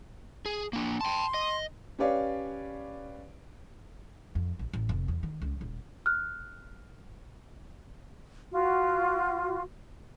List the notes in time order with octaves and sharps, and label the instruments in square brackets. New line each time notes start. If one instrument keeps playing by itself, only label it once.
[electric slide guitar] G#4
A#3 D4
[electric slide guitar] G5 A5 [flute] C6
[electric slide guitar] D#5
[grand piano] C#4 G4 B4 C#5 D5 F5
[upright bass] F2
A#1
A1
F1
E2
D#3
C#2
D#1
[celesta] F6 F#6
[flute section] F4 F#4